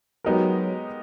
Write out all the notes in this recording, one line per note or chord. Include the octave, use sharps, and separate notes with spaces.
F#3 G#3 B3 D#4 G4 A#4